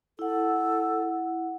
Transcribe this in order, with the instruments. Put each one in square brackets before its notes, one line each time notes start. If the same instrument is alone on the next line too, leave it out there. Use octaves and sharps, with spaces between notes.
[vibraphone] E4 F#5 [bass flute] A4